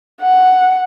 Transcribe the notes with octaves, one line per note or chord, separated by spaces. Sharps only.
F#5